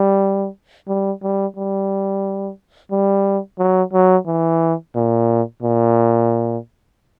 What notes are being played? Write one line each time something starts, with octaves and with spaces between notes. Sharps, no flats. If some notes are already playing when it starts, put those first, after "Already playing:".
Already playing: G3
G3
G3
G3
G3
F#3
F#3
E3
A#2
A#2